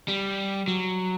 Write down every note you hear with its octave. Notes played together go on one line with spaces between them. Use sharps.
G3
F#3